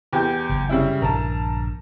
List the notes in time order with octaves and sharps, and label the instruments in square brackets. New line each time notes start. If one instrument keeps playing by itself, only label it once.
[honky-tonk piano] E2 G4 G6
[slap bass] F#1
[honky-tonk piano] C#3 G3 E4
[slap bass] A#1 G2 D3 [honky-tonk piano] A#4 A5